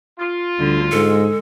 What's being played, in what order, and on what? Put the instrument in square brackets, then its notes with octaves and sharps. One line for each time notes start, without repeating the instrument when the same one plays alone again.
[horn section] F4
[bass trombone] D2 [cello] D3 G3
[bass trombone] G#2 [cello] G#3 [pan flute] A4